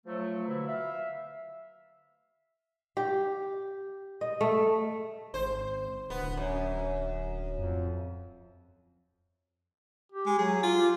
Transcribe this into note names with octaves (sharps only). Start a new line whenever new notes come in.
F3 F#3 A3
B2 D3 A#3 E4
E5 F5
G4
D#5
A3
G#1 C5
D1 B3
F#2
F2
G4
G#3
F#3 G#4
F4
G4